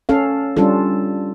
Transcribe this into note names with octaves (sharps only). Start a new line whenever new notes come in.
C#4 A4 F5
G3 C#4 D4 F4 A4